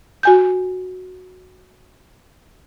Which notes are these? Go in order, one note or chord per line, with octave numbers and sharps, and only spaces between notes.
F#4 G#5 G6